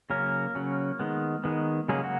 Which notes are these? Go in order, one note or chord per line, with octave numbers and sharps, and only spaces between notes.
C#3 F#3 A#3 C#4 A#4
C#3 F#3 C#4
D#3 G#3 B3
D#3 G#3 B3
C#3 F#3 G#3 A#3 C#4 G#4
F#3 F#4